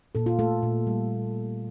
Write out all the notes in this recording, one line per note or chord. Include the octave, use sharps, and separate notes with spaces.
A#2 A4
F4
A3 A4
A#2
G3